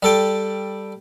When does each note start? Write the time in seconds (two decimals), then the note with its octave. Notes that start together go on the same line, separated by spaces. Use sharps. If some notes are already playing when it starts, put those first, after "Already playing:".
0.03 G3 A4 G5